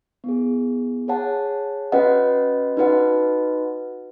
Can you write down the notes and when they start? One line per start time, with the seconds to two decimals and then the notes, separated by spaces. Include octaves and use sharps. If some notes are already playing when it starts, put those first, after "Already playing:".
0.24 B3 E4 G#4
1.08 G#4 C#5 F#5 A5
1.92 C#4 F#4 B4 D#5 F#5
2.77 D#4 F#4 B4 D#5 F#5